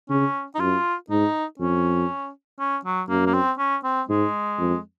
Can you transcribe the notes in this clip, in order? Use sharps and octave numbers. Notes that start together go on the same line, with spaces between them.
C#3 C#4
D#4
F#2 F4
G#2 D#4
F2 C#4
C#4
F#3
F#2 A#3
A#3
C4
C#4
C4
G#2 G#3
F2